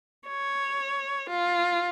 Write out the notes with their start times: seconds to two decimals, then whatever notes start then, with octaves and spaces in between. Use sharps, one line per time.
0.28 C#5
1.30 F4